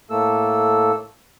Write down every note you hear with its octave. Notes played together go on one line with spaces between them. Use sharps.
A2 A3 A#3 A4 E6